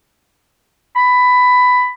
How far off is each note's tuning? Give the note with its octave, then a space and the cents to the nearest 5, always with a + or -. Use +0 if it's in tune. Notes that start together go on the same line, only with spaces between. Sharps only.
B5 +15